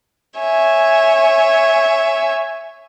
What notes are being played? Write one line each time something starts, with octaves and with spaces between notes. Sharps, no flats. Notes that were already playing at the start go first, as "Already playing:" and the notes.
C#5 E5 G#5